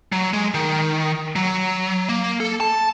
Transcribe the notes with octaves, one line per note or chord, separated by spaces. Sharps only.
F#3
G#3
D#3
F#3
A#3
A4
A5